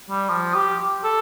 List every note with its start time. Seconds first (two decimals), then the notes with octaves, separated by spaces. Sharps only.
0.10 G3
0.29 F3
0.55 G4
1.04 A4